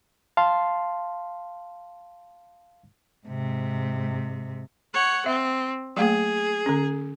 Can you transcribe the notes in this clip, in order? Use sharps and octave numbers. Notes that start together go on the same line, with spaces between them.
F5 A5 C6
G#2 C3
C#5 F#5
C4 E5
F#3 A3 A#3 G#4
D3 C#4